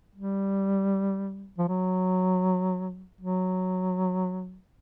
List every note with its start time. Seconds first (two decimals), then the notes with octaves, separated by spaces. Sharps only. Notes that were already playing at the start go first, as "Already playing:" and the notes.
0.15 G3
1.58 F3
1.68 F#3
3.21 F#3